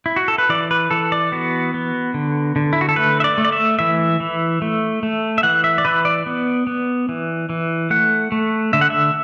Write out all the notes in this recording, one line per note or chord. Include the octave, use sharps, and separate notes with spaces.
E4
F#4
A4
B4
E3 D5
B4
E3 A4
D5
B3 F#4
B3
D3
D3
E4
F#4
A4
A3 B4
E5
D5
A3
D5
E5
E3 E5
E3
A3
A3
E5
E3 F#5
E5
D5
E3 B4
D5
B3
B3
E3
E3
A3 F#5
A3
D3 E5
F#5
E5